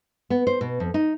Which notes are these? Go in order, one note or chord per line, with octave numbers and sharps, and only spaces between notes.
B3
C5
B2
F2
D#4